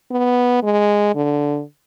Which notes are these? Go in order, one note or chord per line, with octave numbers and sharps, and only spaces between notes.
B3
G#3
D3